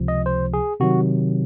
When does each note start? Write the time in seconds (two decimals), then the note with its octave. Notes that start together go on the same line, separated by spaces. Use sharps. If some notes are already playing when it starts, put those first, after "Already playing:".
Already playing: C#2 C3 F3
0.08 D#5
0.26 C5
0.54 G#4
0.80 C3 D#3 F#3 F#4